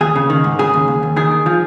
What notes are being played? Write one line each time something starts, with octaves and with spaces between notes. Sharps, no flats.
D#2 G#4
C#3
D#3
G#2
C#3 G#4
D#2
D#2
D#2
D#3 G#4
D#3
F3